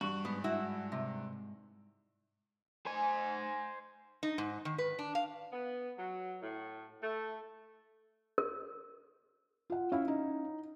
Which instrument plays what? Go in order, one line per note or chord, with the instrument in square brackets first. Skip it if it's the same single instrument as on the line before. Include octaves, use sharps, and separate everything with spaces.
[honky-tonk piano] G2 [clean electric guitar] F#4
[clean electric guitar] G#2 [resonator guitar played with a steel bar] B3
[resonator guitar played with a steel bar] E4 F#4
C3
[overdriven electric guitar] C5 G#5
[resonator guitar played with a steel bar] D#4
G#2
D#3
B4
D4
F5
[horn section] B3
F#3
A2
A3
[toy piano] A#4
[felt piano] F4 F#5
[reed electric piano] C#4 E4 [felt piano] E5 F5
[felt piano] D#4